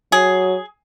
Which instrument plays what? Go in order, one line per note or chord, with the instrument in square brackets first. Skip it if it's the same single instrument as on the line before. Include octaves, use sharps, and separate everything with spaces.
[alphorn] F#3 [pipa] G#4